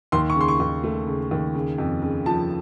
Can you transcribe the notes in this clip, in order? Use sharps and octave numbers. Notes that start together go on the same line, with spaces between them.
D#2 C6
C#6
C#3 C6
C#6
D#2
A3
C#3
D#2
C#3
F2
C#3
F3 A5